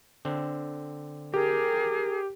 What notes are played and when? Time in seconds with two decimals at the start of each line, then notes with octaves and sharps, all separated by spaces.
0.25 D3 C4
1.34 G4 G#4 A#4